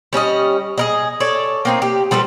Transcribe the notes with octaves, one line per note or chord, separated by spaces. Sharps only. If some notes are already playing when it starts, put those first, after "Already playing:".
G3 C#4 D#4 D#5
G#4 A#4 D#5
A4 C#5 D5
A#3 C4 D#4
G4
F3 G3 A4 B4